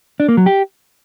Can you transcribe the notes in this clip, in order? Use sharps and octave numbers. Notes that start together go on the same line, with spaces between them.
D4
A#3
F#3
G4